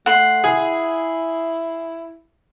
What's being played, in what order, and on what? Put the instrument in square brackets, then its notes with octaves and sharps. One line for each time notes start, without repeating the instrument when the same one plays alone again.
[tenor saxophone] A3 [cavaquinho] F#5 C6
[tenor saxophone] E4 [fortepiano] G#4